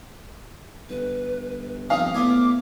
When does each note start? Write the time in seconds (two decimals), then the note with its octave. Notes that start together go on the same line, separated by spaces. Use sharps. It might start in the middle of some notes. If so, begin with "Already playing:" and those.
0.90 G1 B4
1.90 F3 C4 F5 D#6
2.14 E2 A2 B3 G#5 D6